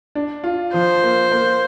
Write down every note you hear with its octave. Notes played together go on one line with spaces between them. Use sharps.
D4
F4
F3 C5
A#3
A#3